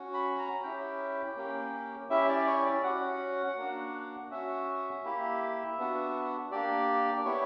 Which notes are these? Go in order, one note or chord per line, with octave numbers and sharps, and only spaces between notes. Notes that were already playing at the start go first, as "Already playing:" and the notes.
Already playing: C#4 F#4
B5
A#5
C#4 E4 G4 G5
A#3 C#4 G4
C#4 E4 G4 E5
D5
C#5
D5
C#4 F#4 F#5
A#3 D4 F#4
C#4 F#4 E5
A#3 E4 G4
B3 D4 F#4
A#3 D4 G4 D5
B3 E4 G4 C#5